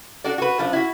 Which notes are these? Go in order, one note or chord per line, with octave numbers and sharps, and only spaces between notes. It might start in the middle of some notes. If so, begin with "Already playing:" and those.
D4 F#4 A4 D5
F#4 B4
F#2 F3 D4
E4 F#4